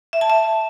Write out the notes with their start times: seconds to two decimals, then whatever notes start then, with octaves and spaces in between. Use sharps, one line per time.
0.13 E5
0.21 A5
0.30 E5